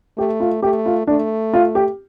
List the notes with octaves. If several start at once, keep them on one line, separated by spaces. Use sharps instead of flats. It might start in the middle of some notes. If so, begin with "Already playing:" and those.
A3 G4
F4
A3 G4
F4
A3 D4
F4
G4